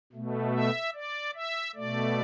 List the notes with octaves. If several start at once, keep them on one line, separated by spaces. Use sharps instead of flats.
B2 A3
E5
D5
E5
B2 A3 D5